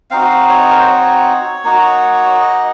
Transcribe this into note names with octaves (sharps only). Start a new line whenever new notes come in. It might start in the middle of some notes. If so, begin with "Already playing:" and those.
C4 D#4 F#4 F5
C#5
A#4
C5
C#5
A#3 D#4 F#4
D#5